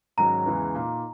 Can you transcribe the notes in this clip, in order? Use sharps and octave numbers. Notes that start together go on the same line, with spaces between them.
G#2 D#3 F#3 C#4 A#5
E2 C#3 E3 G#3
A#2 A#3 D#4